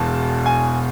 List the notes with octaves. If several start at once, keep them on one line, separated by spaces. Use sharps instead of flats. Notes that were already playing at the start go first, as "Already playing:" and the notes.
Already playing: E1 E2 B2 A5
G#5